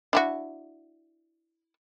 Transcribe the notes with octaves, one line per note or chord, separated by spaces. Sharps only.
D4 E4 F#4